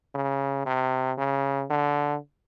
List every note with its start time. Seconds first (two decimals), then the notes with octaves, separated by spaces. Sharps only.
0.15 C#3
0.66 C3
1.18 C#3
1.70 D3